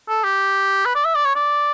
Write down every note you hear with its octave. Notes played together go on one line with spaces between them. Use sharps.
A4
G4
B4
D5
E5
D5
C#5
D5